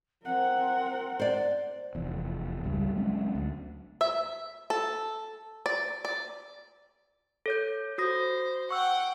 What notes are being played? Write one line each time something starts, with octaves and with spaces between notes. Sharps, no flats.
C4 A#4 F#5
C5 D5
F1 E2
G#1 C#2 G3
F#3 G#3 C4 C#4
D2
E5
A4
D5
D5
A4 C#5 G6
F#4 C5 D#6 A#6
F#5 G5 C#6 E6